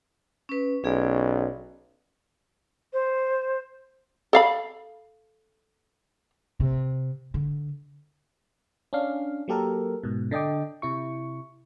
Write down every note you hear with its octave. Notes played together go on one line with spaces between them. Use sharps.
C#4 B4
B1 C#4 G#4 D5
C5
A4 F5 B5
C3
D3
C#4 D4 F5
F#3 A#3 G4 A4 A#4
G#2 B2
D3 D4 D#5 G5 D6
C3 E4 C#6